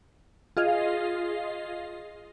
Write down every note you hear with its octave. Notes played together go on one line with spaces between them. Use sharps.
F4 G#4 D#5 F5